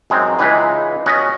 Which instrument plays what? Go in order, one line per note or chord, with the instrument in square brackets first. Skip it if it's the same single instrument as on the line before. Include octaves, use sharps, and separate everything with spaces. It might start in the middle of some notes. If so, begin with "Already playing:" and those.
[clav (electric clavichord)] F#2 G#3 C4 D#4
C#2 E3 G#3 D#4 B4
B3 C#4 F#4 B4 C#5 D#5